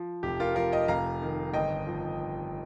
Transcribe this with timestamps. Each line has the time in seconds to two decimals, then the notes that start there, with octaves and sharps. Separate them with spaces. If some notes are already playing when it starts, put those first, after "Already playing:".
Already playing: F3
0.23 F1 G4
0.40 F4 A#4
0.55 F3 F4 A#4
0.72 D#5 G5
0.88 F1 F5 A#5
1.22 D#3
1.54 G1 D#5 G5
1.87 F3